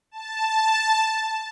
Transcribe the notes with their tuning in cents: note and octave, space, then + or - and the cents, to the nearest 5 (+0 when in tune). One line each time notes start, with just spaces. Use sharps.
A5 +0